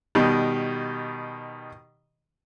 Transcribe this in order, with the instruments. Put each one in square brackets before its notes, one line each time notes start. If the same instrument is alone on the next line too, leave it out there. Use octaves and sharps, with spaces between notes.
[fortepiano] B2 D#3 G3